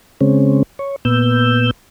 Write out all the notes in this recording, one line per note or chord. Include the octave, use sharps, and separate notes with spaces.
C#3 G#3 C4 C#4
C#5
A#2 B3 E6 G6